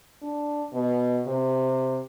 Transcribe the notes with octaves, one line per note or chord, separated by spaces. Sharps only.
D4
B2
C3